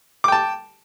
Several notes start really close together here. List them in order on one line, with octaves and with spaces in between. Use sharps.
D6 G5 A5